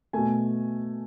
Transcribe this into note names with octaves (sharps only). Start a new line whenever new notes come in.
B2 A3 G#5